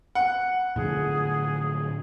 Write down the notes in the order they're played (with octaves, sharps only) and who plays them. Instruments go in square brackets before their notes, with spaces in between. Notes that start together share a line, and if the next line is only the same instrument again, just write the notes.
[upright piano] F#5
[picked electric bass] A2 D3 F3 [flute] G#4